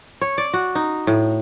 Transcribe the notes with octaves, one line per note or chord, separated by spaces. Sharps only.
C#5
D5
F#4
D#4
A2